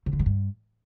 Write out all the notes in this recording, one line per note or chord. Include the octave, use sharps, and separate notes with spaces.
C3
D3
F#3
G2